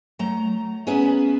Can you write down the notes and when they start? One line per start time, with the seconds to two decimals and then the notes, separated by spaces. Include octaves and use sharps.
0.19 F#3 A3 A#5
0.87 B3 C#4 G#4 B4 E5